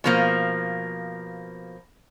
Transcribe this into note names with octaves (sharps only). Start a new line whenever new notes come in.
B2 F3 A#3